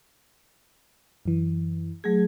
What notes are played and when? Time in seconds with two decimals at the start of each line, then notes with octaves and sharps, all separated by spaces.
1.25 F#2 E3
2.04 F#3 A3 G#4 G#6